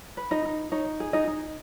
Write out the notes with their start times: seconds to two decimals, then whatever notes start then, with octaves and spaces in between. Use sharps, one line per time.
0.17 B4
0.31 D#4 D#5
0.45 D#4
0.72 D#4 C#5
1.00 G#4
1.13 D#4 D#5
1.27 D#4